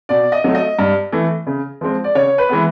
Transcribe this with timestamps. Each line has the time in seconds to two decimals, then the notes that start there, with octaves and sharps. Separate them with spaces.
0.09 B2 D5
0.32 D#5
0.44 F#3 A3
0.55 D#5
0.79 G2
1.12 E3 A3
1.47 C#3
1.81 F3 G#3 C4
2.04 D5
2.15 C#3 C#5
2.38 B4
2.49 E3 G#3 B3